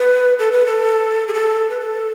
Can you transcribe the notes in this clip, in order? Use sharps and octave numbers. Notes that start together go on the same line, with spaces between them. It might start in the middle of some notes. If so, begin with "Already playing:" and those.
Already playing: B4
A4
B4
A4
G#4
A4
B4
A4